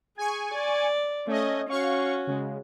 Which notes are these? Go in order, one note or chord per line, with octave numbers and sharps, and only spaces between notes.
G#4 G#5 C#6
D5
A3 C#4 D#5
C#4 F#4 F5 C#6
C#3 G#3